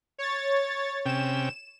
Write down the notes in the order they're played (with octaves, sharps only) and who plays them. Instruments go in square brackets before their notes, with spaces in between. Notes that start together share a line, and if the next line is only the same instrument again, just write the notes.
[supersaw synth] C#5 A6
[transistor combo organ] C3 C#4 G5 [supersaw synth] E7